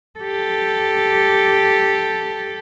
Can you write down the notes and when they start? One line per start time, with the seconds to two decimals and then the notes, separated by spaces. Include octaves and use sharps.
0.20 G4 A4